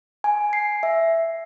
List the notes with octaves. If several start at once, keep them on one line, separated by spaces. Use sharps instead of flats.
G#5
C7
E5